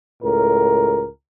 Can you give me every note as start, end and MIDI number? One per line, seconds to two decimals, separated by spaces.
0.22 1.06 37
0.22 1.06 45
0.22 1.06 70